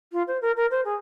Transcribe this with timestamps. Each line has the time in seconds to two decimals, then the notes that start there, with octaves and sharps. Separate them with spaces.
0.13 F4
0.28 C5
0.42 A#4
0.56 A#4
0.71 C5
0.85 G#4